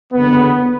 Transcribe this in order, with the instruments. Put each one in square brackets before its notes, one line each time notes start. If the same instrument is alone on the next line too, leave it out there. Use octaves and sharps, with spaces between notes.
[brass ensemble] F#1 E2 D3 B3